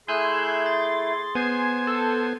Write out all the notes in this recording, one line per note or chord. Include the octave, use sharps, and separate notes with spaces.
A3 E4 G#4 G#5 C6 E6 F#6 G6
A6
B3 C5 G#5 G#6 C7
A4